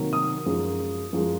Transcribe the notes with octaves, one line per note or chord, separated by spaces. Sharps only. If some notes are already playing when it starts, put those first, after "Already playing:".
Already playing: C3 D#3 F#3 A#3
D#6
F#2 F3 G#3
F#2 F3 G#3